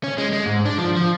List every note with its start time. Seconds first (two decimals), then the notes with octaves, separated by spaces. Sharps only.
0.04 C#4
0.18 G#3
0.33 G#3
0.46 G#2
0.65 D4
0.78 F3
0.97 F3